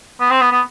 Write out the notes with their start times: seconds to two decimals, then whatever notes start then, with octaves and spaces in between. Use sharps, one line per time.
0.20 B3
0.30 C4
0.41 B3
0.51 B3